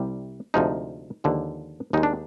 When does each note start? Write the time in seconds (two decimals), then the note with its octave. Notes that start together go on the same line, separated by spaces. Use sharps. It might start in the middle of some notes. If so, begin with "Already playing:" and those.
Already playing: C2 C3 G3
0.54 D2 C3 F3 G#3 D#4
1.24 D#2 D3 F3 G#3
1.93 D#2 D#3 G#3 D#4
2.03 D4